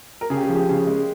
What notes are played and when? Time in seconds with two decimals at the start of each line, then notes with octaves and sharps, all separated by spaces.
0.21 A#4
0.30 C#3 G#4
0.37 G4
0.43 G#4
0.49 F3
0.55 G4
0.69 C#3 G#4
0.87 G#3